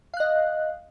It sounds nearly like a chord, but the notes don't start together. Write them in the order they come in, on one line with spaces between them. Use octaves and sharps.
F5 F#6 D#5